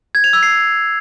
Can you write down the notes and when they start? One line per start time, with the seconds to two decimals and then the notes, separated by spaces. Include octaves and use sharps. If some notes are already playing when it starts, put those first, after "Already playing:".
0.15 G#6
0.24 F7
0.33 E6
0.43 C7